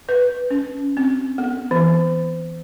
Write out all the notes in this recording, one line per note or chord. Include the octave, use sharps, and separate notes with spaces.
B4
C#4
C4
B3
E3